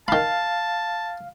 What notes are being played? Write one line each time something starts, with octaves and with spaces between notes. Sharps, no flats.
D#3 F5 A5 B5